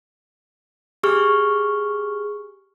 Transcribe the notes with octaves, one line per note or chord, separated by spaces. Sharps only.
G4 G#4 C#6 F6